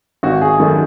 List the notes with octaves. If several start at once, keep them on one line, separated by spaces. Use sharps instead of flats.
G#1 F#4
G#4
F#2 D#3 F#3 A4